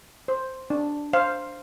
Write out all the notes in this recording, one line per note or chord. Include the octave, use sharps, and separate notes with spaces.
C5
D4
C5 F5